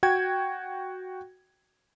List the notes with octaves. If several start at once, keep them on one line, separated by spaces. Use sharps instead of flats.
F#4 G5 G#6